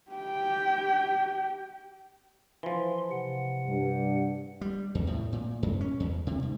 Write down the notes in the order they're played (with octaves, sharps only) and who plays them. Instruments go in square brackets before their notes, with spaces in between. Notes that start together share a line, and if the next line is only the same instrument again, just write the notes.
[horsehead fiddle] G4 G5
[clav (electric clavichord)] E3 F3 [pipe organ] C6
[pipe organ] C3 F#5
[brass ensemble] G2
[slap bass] G3
E2
A2
A#2
F#2
C#4
E2
C3
G#2